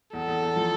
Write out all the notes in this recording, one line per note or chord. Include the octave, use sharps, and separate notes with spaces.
E2 A4
E2
E2
F3